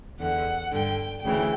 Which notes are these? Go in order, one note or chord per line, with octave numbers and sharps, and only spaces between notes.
E2 D3 F#5
G2 D3 G5
D2 C#3 E3 G5